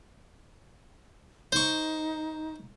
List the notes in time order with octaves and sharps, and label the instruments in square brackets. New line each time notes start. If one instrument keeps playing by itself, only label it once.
[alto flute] D#4 [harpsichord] C5 C#6